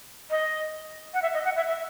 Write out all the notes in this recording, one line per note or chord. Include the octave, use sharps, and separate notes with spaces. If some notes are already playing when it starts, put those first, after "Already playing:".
D#5
F#5
E5
D#5
F#5
E5
E5